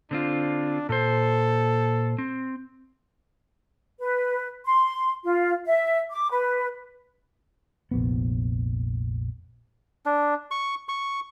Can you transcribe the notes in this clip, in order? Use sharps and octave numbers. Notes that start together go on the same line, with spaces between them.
D3 C4 D4 F4
A#2 A4 C5
C4
B4
C6
F4
E5
D6
B4
F1 A#1 B3
D4
C#6
C#6